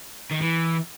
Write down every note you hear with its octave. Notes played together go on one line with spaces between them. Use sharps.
D#3
E3